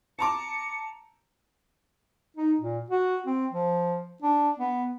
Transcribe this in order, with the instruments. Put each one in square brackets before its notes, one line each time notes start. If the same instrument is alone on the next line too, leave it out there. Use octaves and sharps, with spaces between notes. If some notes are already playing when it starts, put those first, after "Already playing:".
[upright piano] A5 A#5 D6 [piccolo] C#7
[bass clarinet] D#4
A#2
F#4
C4
F3
D4
B3